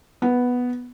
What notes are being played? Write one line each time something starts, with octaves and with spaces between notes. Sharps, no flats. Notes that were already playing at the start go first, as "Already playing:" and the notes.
B3